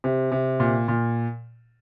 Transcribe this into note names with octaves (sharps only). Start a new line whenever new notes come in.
C3
C3
A#2
A#2